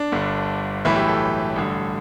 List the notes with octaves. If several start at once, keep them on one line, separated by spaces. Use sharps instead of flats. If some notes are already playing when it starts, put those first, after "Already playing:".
Already playing: D4
G1 G2 D3
B1 A2 E3 E4
G4
A4
A1 G2 D3